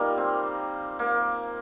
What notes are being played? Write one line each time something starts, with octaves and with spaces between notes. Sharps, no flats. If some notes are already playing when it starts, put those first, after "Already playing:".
Already playing: G3 A#3 D#4 F4
C4
A#3